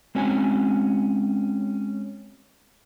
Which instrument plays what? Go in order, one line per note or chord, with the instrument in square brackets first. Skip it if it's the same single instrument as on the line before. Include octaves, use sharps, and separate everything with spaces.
[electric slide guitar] G#3 C4 C#4 F#4 G#5